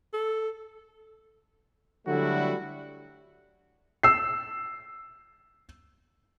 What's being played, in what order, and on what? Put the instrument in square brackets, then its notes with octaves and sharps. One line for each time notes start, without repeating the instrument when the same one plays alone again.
[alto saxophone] A4
[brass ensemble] D3 F#3 G3 A3 E4 F#4
[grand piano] E6 C7